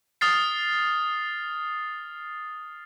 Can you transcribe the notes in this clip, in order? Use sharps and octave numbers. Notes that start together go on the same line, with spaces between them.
D#6 F6 A6 C7